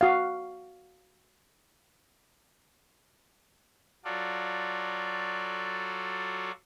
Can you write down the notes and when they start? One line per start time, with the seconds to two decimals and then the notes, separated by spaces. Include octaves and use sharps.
0.01 F#4 F5
4.05 F#3 F4 F#4 A4 D5